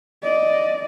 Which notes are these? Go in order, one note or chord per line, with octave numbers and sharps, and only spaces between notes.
D5 D#5